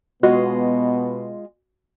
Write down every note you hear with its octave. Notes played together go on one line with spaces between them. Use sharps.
B2 G#3 B3 F4 F#4 D#5